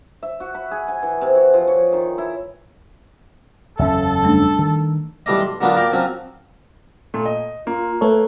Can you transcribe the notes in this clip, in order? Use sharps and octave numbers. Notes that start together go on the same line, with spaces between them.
E5
F#4
B5
G#4
G#5
E3
C3
F#4
F3
C#5
D#3
E4
F#1 E2 C#4 A4 E5
G3 A3 D4
D#3
B1 E3 G3 A3 D5 D#5
C6
D3 F#3 A#3 B3 D4 F4
A#4 D5 F5 G5
F3 F#3 C4 C#4 F4
A#2 A3
D#5
A#3 F4
A3 A4 B4 C#5